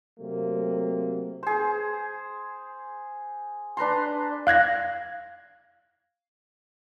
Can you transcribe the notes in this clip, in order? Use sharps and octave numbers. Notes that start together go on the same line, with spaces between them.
C3 F#3 A3 A#3
G#4 C5
D4 B4 A#5 C6
F5 F#6 G#6 A#6